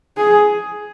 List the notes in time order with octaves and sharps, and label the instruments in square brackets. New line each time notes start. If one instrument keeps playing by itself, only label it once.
[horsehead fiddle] G#4